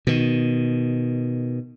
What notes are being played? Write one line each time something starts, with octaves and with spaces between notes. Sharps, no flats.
B2 D#3